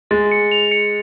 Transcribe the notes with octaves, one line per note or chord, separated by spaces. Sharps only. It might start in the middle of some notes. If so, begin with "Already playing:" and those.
G#3 A6
C#7
F7
C#7